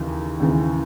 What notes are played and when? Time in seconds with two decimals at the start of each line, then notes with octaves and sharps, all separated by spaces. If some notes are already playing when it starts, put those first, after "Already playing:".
Already playing: D#2 C#3 E3
0.40 D#2 C#3 E3